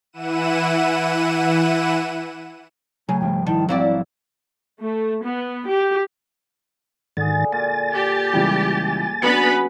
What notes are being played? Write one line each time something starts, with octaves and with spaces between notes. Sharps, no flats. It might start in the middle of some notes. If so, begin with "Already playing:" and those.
E3 E4 F#5 D#7 E7
C#3 F#3 A3 G#4 G#5
G#1 F3 G3 G5
D#3 E4 A5
F#3 C4 E4 D5 F5
A3
B3
G4
G#2 D3 D#3 G#4 A6
A#2 G#5 A6
G4
C#2 E3 G3
F#3 B3 C#4 D4 B4 B5 C#7